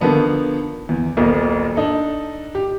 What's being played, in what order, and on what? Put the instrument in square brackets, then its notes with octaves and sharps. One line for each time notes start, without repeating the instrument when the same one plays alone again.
[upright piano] D3 D#3 F3 B3 D4
E2
D#1 B1 A#4 D#5
D4 D#4 A4
G4